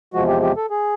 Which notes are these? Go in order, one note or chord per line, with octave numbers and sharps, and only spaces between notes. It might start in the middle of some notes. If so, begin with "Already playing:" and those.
E2 C3 F3 G#3 F#4
G4
G4
A4
G#4